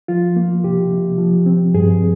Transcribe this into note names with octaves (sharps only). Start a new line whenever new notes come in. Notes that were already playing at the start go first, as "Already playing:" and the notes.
F3 F4
A#3
C3 G4
C3
F3
C4
G2 G#4